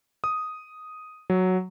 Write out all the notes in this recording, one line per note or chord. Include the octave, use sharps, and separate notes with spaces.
D#6
F#3